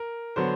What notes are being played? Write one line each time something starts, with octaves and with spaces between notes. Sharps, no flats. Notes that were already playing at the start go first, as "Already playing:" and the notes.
Already playing: A#4
D3 F#3 B3 C5